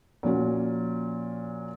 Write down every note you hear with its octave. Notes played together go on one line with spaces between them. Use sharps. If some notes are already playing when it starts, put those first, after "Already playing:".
A#2 F3 C#4 F#4